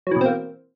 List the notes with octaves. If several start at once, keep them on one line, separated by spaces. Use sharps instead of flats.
B2 E3 F#3 A#3 C4